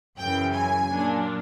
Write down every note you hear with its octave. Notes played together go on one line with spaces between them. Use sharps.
F#2 C#3 E3 G5
G#5
A#2 F#3 A#3 D4